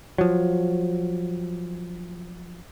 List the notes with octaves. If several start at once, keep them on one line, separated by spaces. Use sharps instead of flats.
F3 F#3